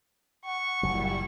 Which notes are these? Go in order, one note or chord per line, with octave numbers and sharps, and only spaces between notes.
F#5 C#6
F#1 A#2 F#3 G3 E4